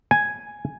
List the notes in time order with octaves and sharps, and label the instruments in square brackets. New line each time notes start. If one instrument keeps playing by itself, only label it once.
[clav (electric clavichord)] G#5